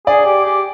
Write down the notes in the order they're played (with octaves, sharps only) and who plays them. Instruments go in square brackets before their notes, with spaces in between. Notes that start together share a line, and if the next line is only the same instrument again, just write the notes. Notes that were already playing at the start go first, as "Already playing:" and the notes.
[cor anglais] G#4 [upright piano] D5
[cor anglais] G4
G4